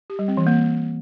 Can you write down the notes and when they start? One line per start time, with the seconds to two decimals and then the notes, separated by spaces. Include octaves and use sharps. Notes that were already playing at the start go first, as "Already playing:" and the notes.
0.10 G4
0.19 G3
0.28 C4
0.37 E3
0.47 A#3